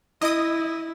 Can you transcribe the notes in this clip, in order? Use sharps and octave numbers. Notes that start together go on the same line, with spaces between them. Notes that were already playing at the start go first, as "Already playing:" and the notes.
E4 D#5 D#6